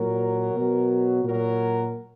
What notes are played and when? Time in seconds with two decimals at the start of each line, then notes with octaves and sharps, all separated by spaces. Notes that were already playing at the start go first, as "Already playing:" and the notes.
Already playing: A#2 F#3 A#4
0.55 B2 F#3
1.24 A#2 F#3 A#4